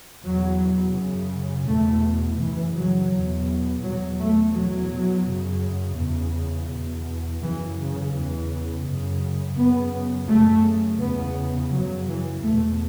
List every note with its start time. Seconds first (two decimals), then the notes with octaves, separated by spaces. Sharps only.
0.24 E2 B2 F#3
0.95 F#2 C#3
1.67 E2 B2 A3
2.39 F#2 C#3 E3
2.75 F#3
3.11 E2 B2
3.83 E2 B2 F#3
4.19 A3
4.54 E2 B2 F#3
5.27 F#2 C#3
5.98 E2 C#3
6.70 E2 B2
7.41 F#2 C#3 E3
7.77 C#3
8.13 E2 C#3 E3
8.85 F#2 C#3
9.57 F#2 C#3 B3
10.28 F#2 C#3 A3
10.99 E2 C#3 B3
11.72 F#2 C#3 F#3
12.08 E3
12.44 E2 B2 A3